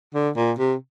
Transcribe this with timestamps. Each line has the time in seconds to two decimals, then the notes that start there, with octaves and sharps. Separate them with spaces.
0.14 D3
0.36 A#2
0.59 C3